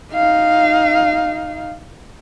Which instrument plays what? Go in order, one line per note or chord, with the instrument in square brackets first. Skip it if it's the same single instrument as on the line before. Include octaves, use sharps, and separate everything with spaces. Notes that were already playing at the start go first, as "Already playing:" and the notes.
[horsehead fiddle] D#4 F5